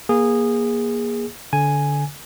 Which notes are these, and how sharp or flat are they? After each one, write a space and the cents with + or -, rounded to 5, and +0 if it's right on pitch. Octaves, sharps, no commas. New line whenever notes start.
A#3 +20 G#4 -15
D3 -20 G#5 +0